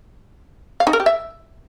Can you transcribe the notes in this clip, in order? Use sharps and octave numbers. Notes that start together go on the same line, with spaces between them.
F5
D#4
A#4
G4
E5